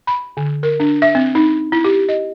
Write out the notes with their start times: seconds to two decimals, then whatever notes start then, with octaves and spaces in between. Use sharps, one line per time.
0.07 B5
0.37 D3
0.63 A#4
0.80 D4
1.02 E5
1.15 C4
1.35 D#4
1.72 E4
1.84 G4
2.09 D#5